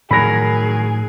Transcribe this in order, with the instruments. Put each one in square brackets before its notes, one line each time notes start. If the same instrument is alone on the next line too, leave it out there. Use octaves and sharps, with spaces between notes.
[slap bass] A2 F3 [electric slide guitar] D#3 F#3 A#4 [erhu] G#4 [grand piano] B5 A#6